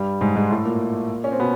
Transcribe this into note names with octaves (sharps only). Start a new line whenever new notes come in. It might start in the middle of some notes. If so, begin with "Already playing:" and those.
Already playing: G2 G3
G#2 G#3
G#2 G#3
A2 A3
A#2 A#3
C#4
C4
B2 B3